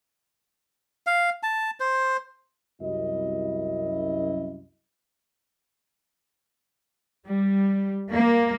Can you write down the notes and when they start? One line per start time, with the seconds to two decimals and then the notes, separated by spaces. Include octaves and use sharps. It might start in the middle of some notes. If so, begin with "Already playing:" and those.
1.07 F5
1.43 A5
1.80 C5
2.82 C2 F#2 E4 D#5
7.28 G3
8.12 A#3